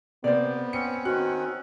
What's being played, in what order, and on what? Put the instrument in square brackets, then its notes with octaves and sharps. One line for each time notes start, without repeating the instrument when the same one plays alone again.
[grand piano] C3 A#3 [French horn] B3 [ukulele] C5 D5
[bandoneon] C4 C#4 [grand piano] C#7
[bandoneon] D#3 C4 C#4 [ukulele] F#4 [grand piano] F#6